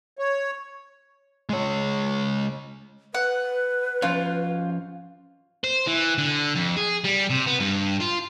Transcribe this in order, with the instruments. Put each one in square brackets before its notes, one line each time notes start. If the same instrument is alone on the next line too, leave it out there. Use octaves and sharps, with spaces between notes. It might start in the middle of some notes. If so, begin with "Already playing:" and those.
[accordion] C#5
[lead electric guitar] G#3 C#5
[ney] B4 [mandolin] F#5
[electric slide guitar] F3 C#4 C#5 [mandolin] F4 C5
[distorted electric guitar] C5
E3
D3
F2
G#4
G3
C3
B3
G2
F4